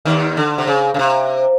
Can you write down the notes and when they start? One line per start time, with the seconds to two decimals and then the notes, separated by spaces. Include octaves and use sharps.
0.05 D#2 D#3
0.37 D3
0.58 C3
0.67 C#3
0.94 C#3
0.99 C3